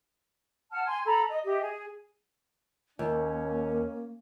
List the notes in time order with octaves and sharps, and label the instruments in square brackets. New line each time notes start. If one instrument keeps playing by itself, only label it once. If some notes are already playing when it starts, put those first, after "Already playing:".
[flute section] F#5 A5 F6
G#5 C6 G#6
A4 A#5 B5
D#5
G4 D#5 E5
G#4
[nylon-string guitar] D#2 [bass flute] A#3 [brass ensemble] C#4